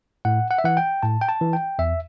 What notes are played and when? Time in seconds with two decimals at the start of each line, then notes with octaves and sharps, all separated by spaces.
0.25 A2 F#5
0.51 F#5
0.58 E5
0.64 E3 F#5
0.77 G5
1.03 A2 A5
1.21 G5
1.29 A5
1.41 E3
1.53 G5
1.79 E2 E5